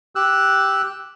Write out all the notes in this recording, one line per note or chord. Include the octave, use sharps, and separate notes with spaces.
G4 E6 F#6